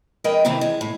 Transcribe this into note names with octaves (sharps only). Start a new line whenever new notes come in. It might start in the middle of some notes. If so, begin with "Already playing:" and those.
F2 G#3 A#4 B4 D#5 G5
A2 C3 D#3 E3 C4
G#3
A2